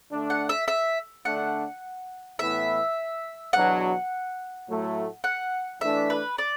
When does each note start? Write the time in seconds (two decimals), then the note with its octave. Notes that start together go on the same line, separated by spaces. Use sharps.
0.11 D3 A3 D4
0.30 F#5
0.49 E5
0.68 E5
1.25 D3 A3 D4 F#5
2.39 A2 E3 B3 E4 B4 E5
3.53 E2 B2 F#3 D4 F#5
4.67 A2 F#3 A3
5.24 F#5
5.81 E3 A3 D4 E5
6.10 B4
6.38 D5